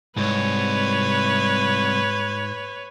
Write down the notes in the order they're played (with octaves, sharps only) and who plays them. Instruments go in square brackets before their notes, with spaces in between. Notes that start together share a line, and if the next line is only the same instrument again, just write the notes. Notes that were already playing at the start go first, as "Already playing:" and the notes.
[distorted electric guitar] C2 [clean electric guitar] G#2 [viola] B4 C#5